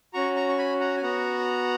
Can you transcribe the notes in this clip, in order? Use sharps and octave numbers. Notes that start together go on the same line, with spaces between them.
C#4 F#4 A#5 C#6
A#5 C#6
C#6
G#5 B5
F#5 A#5
G#5
B3 F#4 F#5 A#5